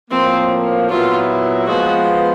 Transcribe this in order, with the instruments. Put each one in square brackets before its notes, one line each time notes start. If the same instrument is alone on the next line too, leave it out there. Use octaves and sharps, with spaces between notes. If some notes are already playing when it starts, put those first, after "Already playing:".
[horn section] A2 F3 A#3 [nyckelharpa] C4
[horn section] A#2 F#3 B3 E4 [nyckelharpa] F4
[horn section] F3 G#3 B3 [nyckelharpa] F#4